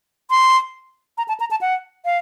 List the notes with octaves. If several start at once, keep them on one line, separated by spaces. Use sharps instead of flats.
C6
A#5
A5
A#5
A5
F#5
F5